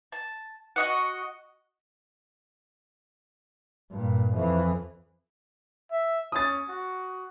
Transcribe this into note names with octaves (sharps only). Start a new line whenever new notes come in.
A5
F#4 D#5 F#5
G2 A#2
F2 E3
E5
C#4 D#6 A6
F#4